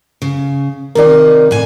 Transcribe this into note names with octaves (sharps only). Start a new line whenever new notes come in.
C#3
C3 D#3 D#4 A#4 D5
A2 G#5